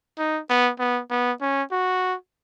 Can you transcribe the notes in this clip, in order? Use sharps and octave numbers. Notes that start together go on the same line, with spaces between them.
D#4
B3
B3
B3
C#4
F#4